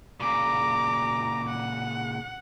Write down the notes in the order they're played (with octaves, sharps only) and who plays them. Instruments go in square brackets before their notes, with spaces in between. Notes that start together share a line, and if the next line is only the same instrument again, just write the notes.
[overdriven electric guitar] A#2 C#3 [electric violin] A#5 D6
[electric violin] F#5